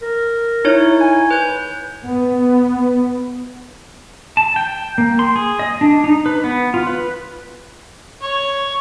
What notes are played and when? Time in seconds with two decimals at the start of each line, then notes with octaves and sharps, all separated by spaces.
0.02 A#4
0.65 D#4 E4 C#5
1.01 G#5
1.31 B4 G6
2.05 B3
4.37 A5
4.56 G5
4.98 A#3
5.19 C6
5.36 G#4
5.59 D#5
5.81 D4
6.04 D#4
6.26 B4
6.44 B3
6.74 F4
6.87 B4
8.23 C#5